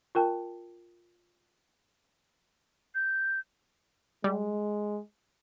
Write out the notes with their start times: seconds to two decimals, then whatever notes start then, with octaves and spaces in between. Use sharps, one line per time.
0.15 F4 A#4 G5 A5
2.95 G6
4.24 G3 G#3